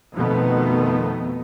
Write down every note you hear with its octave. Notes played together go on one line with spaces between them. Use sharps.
F2 B2 D#3 A3 B3